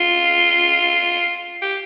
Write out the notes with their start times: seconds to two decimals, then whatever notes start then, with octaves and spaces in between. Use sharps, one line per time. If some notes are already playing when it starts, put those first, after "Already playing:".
Already playing: F4
1.62 G4